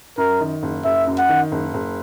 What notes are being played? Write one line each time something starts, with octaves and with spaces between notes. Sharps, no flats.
F#2 A#4
D#3
F#1
F#1 E5
F#2
F#5
D#3
F#1
F#1